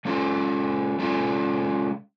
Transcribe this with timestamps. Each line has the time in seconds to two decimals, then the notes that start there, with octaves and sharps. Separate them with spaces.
0.05 G#3 C#4 F4 A4
0.99 G#3 C#4 F4 A4